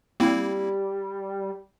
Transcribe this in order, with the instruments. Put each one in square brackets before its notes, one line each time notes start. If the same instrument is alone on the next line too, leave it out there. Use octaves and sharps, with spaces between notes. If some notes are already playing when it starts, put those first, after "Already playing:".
[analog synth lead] G3 [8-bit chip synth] A#3 C4 E4